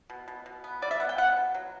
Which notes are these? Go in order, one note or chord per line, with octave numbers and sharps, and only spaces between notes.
B2
B2
B2
B3
G3 D5
E5
B3 F#5
G5
B3 F#5
B2
F#3